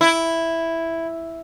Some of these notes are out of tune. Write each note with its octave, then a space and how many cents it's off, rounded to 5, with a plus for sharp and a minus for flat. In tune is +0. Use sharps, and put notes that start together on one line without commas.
E4 +0